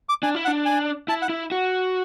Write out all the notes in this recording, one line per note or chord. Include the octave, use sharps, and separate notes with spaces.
D6
D4 G#5
E4
F#5
D4
G#5
E4 A5
F#5
E4
F#4